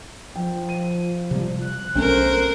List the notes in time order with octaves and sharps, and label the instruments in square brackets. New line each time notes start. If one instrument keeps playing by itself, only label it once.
[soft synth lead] F3 [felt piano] G5
[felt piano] D#7
[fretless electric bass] C3 G3
[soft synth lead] F#6
[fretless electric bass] B1 [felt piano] A3 C4 C#4 [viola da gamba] A#4 C5